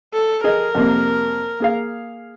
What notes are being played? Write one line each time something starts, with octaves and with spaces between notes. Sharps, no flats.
A4
G#4 A#4 D#5
F2 C3 A#3
A#3 G#4 F5